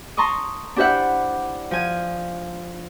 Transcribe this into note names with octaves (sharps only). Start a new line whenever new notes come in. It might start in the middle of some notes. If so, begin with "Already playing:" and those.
A5 A#5 C6 C#6 D#6
D4 E4 G4 C5 E5 F#5
F3 G#5